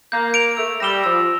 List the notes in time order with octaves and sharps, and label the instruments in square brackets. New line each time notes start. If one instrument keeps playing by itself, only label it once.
[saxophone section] A#3 [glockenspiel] G6
[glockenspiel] D7 F7
[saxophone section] A3 [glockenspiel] E6
[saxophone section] G3 [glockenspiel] A#6 E7 G7
[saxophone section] F3 [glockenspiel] E6